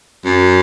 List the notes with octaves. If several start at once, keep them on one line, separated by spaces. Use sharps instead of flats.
F#2